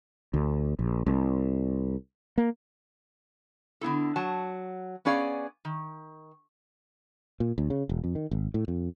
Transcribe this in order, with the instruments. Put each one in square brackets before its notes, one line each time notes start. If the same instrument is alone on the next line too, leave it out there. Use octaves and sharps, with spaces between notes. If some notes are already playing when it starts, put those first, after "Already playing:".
[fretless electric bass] D2
A#1
C2
A#3
[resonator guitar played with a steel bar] D3 B3 E4 A4
F#3 F#5 A5
B3 C#4 G#4 D5 F5
D#3
[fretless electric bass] A#2
D2
C#3
E1
F2
D#3
G#1
A2
F2